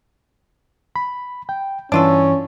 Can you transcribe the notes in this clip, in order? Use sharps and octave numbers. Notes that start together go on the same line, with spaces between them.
B5
G5
G2 E3 C#4 D4 F4 A4